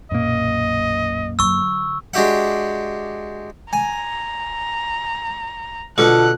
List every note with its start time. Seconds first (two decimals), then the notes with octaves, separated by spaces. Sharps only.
0.11 B1 F#2 A#2 A#3 D#5
1.39 D3 F#3 C#6 E6
2.14 G#3 D4 F#4 G4 E5 F#5
3.73 G#5 A#5
5.98 B2 D3 F4 A5 F#6